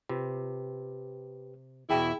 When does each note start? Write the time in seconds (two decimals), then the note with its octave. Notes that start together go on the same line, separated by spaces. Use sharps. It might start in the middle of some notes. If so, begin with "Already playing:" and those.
0.09 C3 F4 G4 B4
1.90 E2 B2 E4 G#4 G5 A5